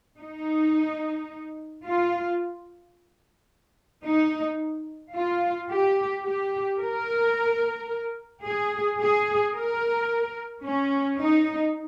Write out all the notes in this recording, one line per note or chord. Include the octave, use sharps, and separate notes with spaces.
D#4
F4
D#4
F4
G4
G4
A#4
G#4
G#4
A#4
C#4
D#4